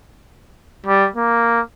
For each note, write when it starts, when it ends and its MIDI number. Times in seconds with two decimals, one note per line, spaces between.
0.86 1.07 55
1.16 1.60 58